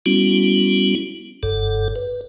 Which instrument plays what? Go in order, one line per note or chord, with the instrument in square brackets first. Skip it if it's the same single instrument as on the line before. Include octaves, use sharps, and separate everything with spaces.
[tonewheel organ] G3 B3 C#4 E4 F#4
F#1 G2 A4
B4